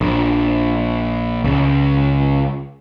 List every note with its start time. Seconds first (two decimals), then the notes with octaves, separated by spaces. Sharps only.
0.01 A#1
1.44 C#2